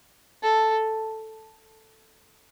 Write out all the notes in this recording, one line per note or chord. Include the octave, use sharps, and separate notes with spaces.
A4